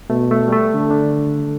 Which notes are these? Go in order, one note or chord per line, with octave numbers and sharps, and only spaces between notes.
B2 A3
A3
G3
A3
D3
D4